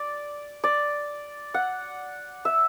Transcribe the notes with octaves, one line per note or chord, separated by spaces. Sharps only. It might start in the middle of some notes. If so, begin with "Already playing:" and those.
Already playing: D5
D5
F#5
E5